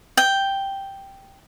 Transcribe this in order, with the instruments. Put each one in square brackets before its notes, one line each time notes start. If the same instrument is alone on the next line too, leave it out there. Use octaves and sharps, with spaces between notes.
[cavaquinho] G5